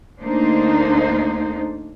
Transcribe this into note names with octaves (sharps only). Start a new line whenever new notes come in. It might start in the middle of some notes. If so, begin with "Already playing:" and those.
D2 A#3 D4 D#4 C5